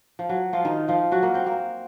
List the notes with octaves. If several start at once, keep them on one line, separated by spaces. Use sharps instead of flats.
F3
F#3
F3 F4
D#3 D#4
F3 F4
F#3 F#4
A#3 A#4
C4 C5
A#3 A#4